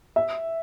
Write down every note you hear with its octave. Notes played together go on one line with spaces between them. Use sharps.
E5